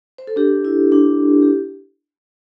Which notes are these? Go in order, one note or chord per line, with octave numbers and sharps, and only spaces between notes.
C5
A4
D4 G4
E4
D4
G4